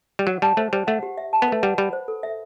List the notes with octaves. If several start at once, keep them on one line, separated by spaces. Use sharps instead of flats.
G3
F#3 F#5
G3 A5
A3 C5
G3 C5
A3 F#5
G4
E5
A5
B3
A3 B4
G3 F#5
G3 B5
C5
A4
E5